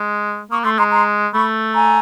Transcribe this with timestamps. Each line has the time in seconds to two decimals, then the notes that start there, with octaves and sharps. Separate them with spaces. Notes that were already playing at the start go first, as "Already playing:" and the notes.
Already playing: G#3
0.51 A#3 C#6 D#6
0.64 A3 C6 D6
0.78 G#3 A#5 C6
0.92 A#5 C6
1.33 A3 B5 C#6
1.74 G#5 A#5